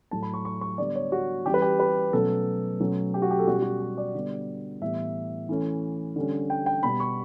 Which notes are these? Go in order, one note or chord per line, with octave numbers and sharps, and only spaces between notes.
A2 F#3 A3 A5
B5
C#6
C#6
C#6
D3 G3 B3 D5
C#5
F#4
E3 G3 C#4 G4
B4
G4
B4
B2 F#3 A3 C#4 A4
B2 F#3 A3 C#4
G4
F#4
G4
A4
B2 G3 C#4 F#4
G4
F#4
G4
D5
D3 G3 B3
A2 E3 G3 B3 E5
E3 A3 C#4
D3 G3 C#4
G5
G5
B2 G3 B3 B5
C#6